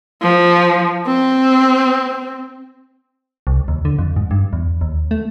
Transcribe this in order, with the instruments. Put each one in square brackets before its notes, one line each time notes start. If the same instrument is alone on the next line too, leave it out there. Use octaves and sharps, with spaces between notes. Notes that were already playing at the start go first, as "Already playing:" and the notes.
[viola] F3
C4
[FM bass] C2
D#2
D3
F2
G#2
G2
E2
D#2
A3